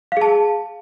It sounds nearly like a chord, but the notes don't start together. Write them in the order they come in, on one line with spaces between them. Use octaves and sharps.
F5 G#4 A5